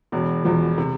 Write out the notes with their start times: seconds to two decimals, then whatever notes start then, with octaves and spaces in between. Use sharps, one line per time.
0.12 E1 E2 B2
0.44 E1 E2 B2 F3
0.78 C3